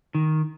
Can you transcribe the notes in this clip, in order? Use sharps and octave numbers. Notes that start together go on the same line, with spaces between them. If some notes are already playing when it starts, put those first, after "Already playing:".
D#3